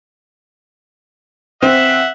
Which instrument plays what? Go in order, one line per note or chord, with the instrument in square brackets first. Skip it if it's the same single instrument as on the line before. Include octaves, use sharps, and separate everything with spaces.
[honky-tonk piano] C4 [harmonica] E5 F#5